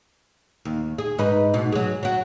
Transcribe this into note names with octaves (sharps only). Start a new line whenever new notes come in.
D#2
G#4
G#2 D#4 B4
G#2 B2
F#3 G#4
F#3 F#4